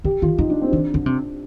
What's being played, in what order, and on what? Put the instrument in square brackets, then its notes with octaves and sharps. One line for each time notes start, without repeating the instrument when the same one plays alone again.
[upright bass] D3 [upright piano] G4
[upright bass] D#3 [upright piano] F4
[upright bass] F3 [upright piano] D#4
[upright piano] D4
C4
[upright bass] D#3 [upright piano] D4
[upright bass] D3
C3